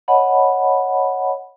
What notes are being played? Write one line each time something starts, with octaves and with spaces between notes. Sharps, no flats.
C#5 D#5 F#5 A5 B5